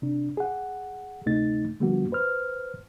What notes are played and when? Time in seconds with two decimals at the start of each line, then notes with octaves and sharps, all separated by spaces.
0.02 C3 D4
0.37 G#4 F#5
1.26 D2 C3 A3 D#4 A6
1.80 D3 F3 G3 A#3 B3 F#4
2.12 B4 C5 F6